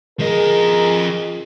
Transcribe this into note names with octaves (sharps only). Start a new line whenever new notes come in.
F3 G#4 A#4 D#5